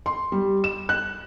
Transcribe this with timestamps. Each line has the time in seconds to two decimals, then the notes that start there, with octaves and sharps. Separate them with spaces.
0.06 C6
0.32 G3
0.64 E7
0.89 F#6